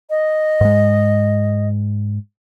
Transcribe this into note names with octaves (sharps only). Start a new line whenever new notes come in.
D#5
G#2 G#3